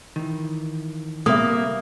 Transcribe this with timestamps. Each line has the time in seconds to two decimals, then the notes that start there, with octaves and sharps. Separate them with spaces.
0.16 D#3 E3
1.26 C3 G3 A#3 B3 E5 C6 D#6